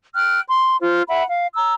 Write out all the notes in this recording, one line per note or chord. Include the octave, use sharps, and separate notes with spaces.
G5 F6 F#6
C6
F4 C5
E5 F#5 B5
F5
A#5 E6